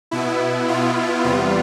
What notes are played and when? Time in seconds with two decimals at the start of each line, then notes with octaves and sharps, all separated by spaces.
0.11 B2 B3 E4
0.68 F4
1.24 E2 C3 G3 B3 F4